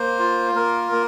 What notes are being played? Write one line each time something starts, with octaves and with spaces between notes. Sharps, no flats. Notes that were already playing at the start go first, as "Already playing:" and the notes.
Already playing: A#3 C5
F4
A#3 A#4
A#3